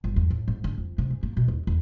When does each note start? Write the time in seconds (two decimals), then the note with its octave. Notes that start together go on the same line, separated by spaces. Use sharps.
0.04 G1
0.16 E2
0.30 A2
0.48 G#2
0.64 D3
0.78 F2
0.98 C3
1.10 G#2
1.23 A#3
1.37 B2
1.48 D#2
1.67 E2